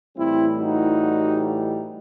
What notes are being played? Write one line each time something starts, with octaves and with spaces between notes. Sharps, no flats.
A2 E3 G3 C4 E4
D#4 F#4